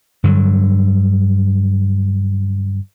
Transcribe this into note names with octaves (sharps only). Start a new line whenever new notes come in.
G2 D3 F#3